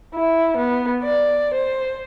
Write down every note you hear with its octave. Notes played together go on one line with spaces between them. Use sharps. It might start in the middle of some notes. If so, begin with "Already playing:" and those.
E4
B3
D5
C5